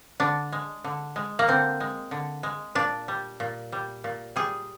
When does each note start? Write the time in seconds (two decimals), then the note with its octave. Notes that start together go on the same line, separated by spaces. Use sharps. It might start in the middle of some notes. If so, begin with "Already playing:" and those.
0.20 D3 D4
0.52 G#3
0.84 D3
1.16 G#3
1.39 A#3
1.48 D3 C4
1.80 G#3
2.11 D3
2.43 G#3
2.75 A#2 D4
3.08 G3
3.40 A#2
3.72 G3
4.04 A#2
4.36 G3 G#4